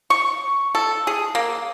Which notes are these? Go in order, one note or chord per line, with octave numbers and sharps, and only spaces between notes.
C#6
A4
G#4
A#3